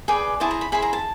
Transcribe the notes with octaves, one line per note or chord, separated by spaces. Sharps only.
G#4 B4 D5 G5
E4 G#4 C5 A5
A#5
B5
E4 G#4 C5 B5
A#5
A5